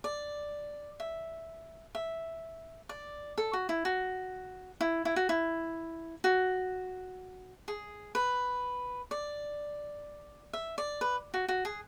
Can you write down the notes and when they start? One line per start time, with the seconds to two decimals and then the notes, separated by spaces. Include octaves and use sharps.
0.04 D5
1.00 E5
1.95 E5
2.89 D5
3.38 A4
3.53 F#4
3.69 E4
3.85 F#4
4.81 E4
5.05 E4
5.16 F#4
5.29 E4
6.24 F#4
7.68 G#4
8.15 B4
9.11 D5
10.53 E5
10.78 D5
11.01 B4
11.34 F#4
11.48 F#4
11.65 G#4